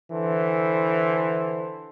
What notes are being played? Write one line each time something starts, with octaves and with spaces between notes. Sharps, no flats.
D3 E3 A4 C5